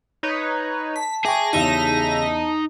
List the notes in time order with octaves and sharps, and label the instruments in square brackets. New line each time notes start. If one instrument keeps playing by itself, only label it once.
[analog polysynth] D#4 B4 C#5
[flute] A5 [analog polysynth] B6
[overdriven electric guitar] G#4 [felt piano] E5 G5 C#6 [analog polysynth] D6 A#6
[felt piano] E2 G4 [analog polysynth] C#3 E5 A#6 [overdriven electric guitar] D#4